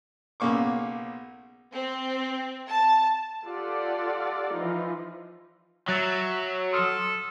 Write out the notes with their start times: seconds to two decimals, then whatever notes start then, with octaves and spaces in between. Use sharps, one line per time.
0.40 B1 C#3 A#3 C#6 D6
1.72 C4
2.68 A5
3.46 F4 G4 A4 D5 F#5
4.53 E3 F3 D#4 F4
5.88 F#3 E5 F#6 A6
6.73 A4 C6 D#6 F6